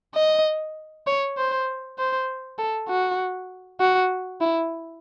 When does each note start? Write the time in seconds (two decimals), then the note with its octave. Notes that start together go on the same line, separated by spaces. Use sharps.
0.15 D#5
1.07 C#5
1.37 C5
1.98 C5
2.58 A4
2.88 F#4
3.80 F#4
4.41 E4